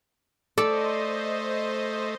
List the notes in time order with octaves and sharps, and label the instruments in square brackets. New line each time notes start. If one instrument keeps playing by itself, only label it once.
[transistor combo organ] A3 [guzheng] A4 [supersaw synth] C5 D#5 [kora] D5